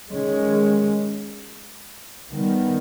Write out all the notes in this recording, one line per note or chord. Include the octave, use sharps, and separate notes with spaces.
D#3 G#3 C#4
D#3 G3 B3